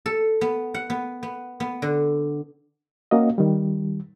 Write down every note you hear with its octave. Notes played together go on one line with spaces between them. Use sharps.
A4
B3
F#5
B3
B3
B3
D3
A#3 C#4 F#4 D#5
D#3 G3